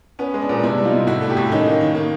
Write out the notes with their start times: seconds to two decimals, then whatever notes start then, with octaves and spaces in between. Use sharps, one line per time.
0.19 B3 C#4
0.34 G#3
0.42 D4
0.49 A#2
0.63 C3 D4 E4
0.78 G3
0.85 D#4 F4
0.93 C3
1.07 A2 E4 F#4
1.21 A3
1.29 G4 A4
1.37 A2
1.51 D#3 C#4 D#4
1.66 A#3
1.81 D#3
1.95 A#3